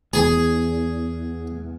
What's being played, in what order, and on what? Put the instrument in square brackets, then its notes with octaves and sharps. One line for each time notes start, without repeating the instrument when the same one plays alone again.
[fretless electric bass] E2 [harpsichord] G#4